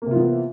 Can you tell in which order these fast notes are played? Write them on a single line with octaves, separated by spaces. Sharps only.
A#3 C3 F4 E3 B3